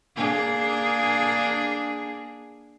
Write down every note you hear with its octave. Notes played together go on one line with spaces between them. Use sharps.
A#3 D4 G#4